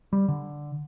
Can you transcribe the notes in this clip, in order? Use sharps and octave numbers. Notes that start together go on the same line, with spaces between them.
G3
D3